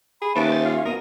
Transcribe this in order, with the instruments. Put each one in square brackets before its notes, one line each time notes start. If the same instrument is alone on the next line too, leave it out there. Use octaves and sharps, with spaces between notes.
[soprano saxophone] G#4 [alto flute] B5
[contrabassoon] D#2 [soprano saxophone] C#4 [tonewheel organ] B4 A5 D6 [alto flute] E5
[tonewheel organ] C5 A6
F4 F5
[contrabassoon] B2 [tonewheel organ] A#3 D#6 [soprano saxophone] A#4